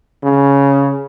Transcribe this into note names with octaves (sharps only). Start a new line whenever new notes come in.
C#3